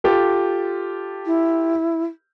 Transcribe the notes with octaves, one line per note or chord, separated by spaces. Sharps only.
F4 G4 A4
E4